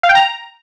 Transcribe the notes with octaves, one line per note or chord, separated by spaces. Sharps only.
F5
G5
A#5